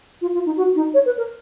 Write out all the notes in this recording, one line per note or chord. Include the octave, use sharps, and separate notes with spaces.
F4
F4
D#4
F#4
D#4
C#5
B4
A#4